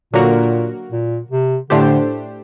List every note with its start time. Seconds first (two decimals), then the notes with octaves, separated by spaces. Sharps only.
0.13 A#2 D3 F#3 A#3 F#4 A#4
0.92 A#2
1.31 C3
1.70 A2 D3 A3 D4 G4 C5